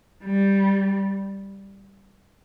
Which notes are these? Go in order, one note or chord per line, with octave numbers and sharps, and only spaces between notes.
G3